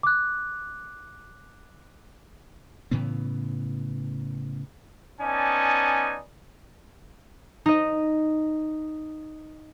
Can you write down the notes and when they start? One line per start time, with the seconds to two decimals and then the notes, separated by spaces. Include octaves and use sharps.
0.03 D6 F#6
2.91 A2 C#3 E3 B3
5.21 B3 C#4 D#4 D5 G#5 A5
7.66 D#4 D#5